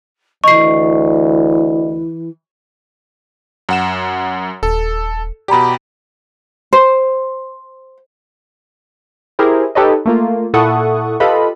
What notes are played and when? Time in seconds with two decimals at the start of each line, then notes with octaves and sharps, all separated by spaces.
0.44 D2 E3 D#5 C#6 C7
3.69 F#2 F#5 E7
4.63 D#1 A4
5.48 B2 G4 D5 A#5 B5
6.73 C5
9.39 E4 G4 G#4 A#4 C5
9.75 D#4 G4 A4 B4 C#5 D#5
10.06 A3 A#3 F4
10.54 A#2 E4 A4 F#5 C#6 D#6
11.20 F4 G4 A4 B4 D#5 B5